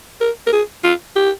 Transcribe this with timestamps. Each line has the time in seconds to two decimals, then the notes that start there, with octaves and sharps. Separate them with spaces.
0.21 A#4
0.47 A#4
0.53 G#4
0.84 F4
1.16 G4